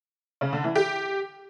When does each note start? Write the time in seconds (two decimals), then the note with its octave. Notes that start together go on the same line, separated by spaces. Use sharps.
0.41 C#3
0.53 D3
0.64 E3
0.75 G4